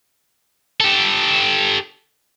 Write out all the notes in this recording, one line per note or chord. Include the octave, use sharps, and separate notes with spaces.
G4 A4